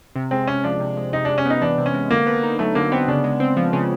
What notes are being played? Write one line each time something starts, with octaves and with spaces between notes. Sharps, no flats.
C3
G#3 C4
C3 C#4
F3 D4
C3
G#3
C3 D#4
G#3 D4
C#4
B3 D#4
E3 D4
C3
C#4
G#3
D3 A#3
B3
D#4
F#3 A3
D3 A#3
B3 C4
C#3 D4
G#3
C4
F3
C#3